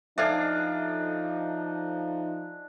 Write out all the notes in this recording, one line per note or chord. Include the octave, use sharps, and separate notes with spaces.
F3 D4 D#4 A4 C5 E5 F5 G#5